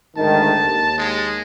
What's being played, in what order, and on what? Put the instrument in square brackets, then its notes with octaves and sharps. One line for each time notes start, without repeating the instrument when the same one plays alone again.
[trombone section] D2 G#2 D#3 [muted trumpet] A5
[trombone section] D#2
[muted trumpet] G#3